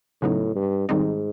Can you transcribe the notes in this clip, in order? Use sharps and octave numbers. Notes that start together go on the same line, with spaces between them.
A2 C#3 F#3 B3 D#4
G2
G#2 D#3 G3 C4 D#4